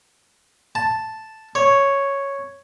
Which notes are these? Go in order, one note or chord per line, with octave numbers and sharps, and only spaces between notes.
A5
C#5